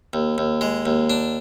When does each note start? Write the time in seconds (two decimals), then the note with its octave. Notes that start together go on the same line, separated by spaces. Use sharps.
0.13 D#2
0.38 D#2
0.61 G#3
0.86 D#2
1.10 D4